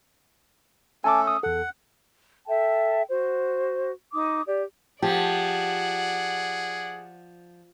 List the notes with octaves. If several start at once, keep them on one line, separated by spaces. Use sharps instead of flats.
A3 C#4 A4 G#5 A5 D6
D#6
E2 A4 F#5
A4 E5 G5 A5
F#4 C5
D#4 D6 D#6
G4 D5
F3 G4 G#4 D5 F#5